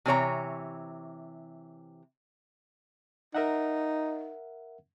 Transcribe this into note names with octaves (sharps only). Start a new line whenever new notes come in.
C3 E3 C#5 A#5
D#4 A#4 E5 F#5